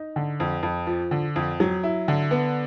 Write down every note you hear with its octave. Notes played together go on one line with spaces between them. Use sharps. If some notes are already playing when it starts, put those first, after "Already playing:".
Already playing: D#4
D3
F2
F2
F3
D3
F2
F#3
E4
D3
B3